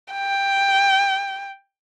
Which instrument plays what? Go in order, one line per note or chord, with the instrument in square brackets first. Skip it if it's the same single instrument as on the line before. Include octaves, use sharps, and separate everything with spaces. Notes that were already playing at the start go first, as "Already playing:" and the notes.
[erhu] G5